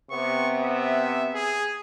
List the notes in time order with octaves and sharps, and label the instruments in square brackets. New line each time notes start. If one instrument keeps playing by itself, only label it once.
[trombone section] C3 B3 [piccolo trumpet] C#6
[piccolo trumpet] E5
G#4